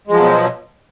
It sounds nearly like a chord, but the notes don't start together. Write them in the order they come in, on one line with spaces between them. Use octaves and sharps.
G#3 F3 F#3 B2